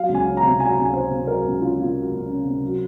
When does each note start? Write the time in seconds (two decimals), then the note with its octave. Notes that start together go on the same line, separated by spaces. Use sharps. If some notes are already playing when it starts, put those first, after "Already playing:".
Already playing: F#3 F5
0.09 C#2
0.14 G#5
0.26 C#4
0.37 A#5
0.43 C3
0.60 F#3 G#5
0.69 A#5
0.77 C#2 G#5
0.93 C#4 C5
1.11 C3
1.27 F#3 A#4
1.44 C#2 F#4
1.61 C#4 F4
1.78 C3 F4
1.95 F#3
2.11 C#2
2.28 C#4
2.45 C3
2.62 F#3